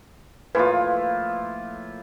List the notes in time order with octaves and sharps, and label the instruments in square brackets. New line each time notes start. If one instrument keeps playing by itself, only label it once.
[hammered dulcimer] A2 F3 A#3 [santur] E4 F4 [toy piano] B4 G#5